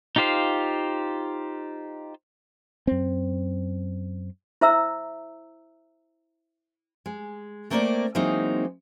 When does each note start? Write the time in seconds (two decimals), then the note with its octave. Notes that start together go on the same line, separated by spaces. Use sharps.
0.16 D#4 F4 G4 C5 F5
2.87 F#2 C4
4.61 E4 C5 E5 A#5 E6
7.06 G#3
7.70 A3 A#3 C4 A#4 C#5 D5
8.15 E3 F#3 G#3 A#3 C4 D#4